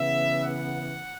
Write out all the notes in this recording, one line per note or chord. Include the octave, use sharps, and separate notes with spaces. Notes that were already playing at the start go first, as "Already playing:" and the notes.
Already playing: C#3 E3 B3 E5
F#5